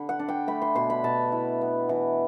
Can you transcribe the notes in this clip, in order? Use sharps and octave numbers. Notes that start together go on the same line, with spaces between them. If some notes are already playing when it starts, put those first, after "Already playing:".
Already playing: D3 B5
F#5
D4
G5
A3 B5
C6
B2 C6
B5
B2 A5
E4
B3
E3